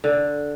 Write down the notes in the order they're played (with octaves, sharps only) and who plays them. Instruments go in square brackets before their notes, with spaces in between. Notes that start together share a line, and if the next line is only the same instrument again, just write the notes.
[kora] D3